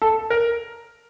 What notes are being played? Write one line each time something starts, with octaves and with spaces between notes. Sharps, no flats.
A4
A#4